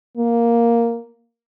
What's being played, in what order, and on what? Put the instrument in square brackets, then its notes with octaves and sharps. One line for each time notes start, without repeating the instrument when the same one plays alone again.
[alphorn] A#3